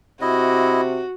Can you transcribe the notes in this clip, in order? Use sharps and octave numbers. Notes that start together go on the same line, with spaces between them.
C3 E4 F#4 D#5